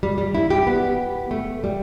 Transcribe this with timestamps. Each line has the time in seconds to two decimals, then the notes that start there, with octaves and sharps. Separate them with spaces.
0.03 G3
0.18 G3
0.35 E4
0.50 G4
0.67 B3
1.31 A3
1.64 G3